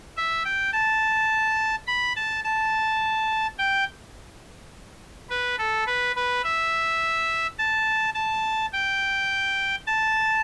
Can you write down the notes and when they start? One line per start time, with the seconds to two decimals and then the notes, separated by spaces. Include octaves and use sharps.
0.17 E5
0.44 G5
0.73 A5
1.87 B5
2.16 A5
2.44 A5
3.58 G5
5.30 B4
5.58 A4
5.86 B4
6.16 B4
6.44 E5
7.59 A5
8.15 A5
8.73 G5
9.87 A5